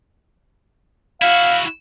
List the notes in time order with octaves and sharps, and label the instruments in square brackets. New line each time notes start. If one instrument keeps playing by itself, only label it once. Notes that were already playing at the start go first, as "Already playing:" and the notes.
[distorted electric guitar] E4 F#4 [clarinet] F5